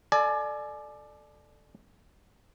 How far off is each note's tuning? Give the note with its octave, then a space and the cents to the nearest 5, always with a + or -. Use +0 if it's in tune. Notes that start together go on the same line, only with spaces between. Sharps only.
A4 +0 D5 +20 G#5 +35